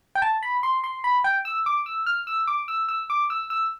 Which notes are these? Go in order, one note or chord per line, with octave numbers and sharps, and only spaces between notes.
G5
A5
B5
C6
C6
B5
G5
E6
D6
E6
F6
E6
D6
E6
E6
D6
E6
E6